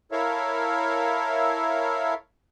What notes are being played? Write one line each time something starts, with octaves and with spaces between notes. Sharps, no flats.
E4 A4 A#4 C#5 E5 F5